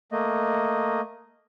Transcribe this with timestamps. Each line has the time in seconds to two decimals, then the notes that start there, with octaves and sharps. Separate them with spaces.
0.12 A3 A#3 D#5